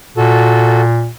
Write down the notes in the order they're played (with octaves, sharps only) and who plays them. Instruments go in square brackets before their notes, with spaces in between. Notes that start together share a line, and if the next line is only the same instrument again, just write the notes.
[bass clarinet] A#2 [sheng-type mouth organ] F#4 A4